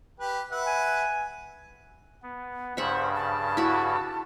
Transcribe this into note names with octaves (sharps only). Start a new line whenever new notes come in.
G4 B4
B4 E5 F#5
G#5
B3
G2 C#3 C5 E5 F#5
A5
E4 F#4